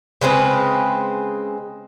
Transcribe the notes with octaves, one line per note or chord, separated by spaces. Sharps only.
C#3 G#3 C4 B4